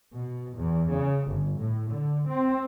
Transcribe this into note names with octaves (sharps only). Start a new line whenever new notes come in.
B2
E2
C#3
G1
A2
D3
C4